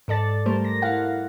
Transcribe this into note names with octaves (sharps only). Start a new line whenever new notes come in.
G#2 A4 D5 A6
G3 A3 A#4 C5
A#6
E4 F5 F#5